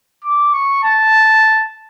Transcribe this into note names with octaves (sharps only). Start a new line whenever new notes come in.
D6
C#6
A5